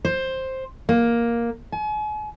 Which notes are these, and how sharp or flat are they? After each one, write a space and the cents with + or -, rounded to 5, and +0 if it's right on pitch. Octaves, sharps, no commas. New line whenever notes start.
C5 +10
A#3 +5
G#5 +40